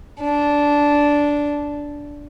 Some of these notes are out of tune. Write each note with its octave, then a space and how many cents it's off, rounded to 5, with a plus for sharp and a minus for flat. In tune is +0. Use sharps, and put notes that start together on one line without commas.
D4 -10